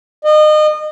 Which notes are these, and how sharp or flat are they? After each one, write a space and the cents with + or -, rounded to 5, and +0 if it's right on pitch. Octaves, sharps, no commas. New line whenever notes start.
D#5 -30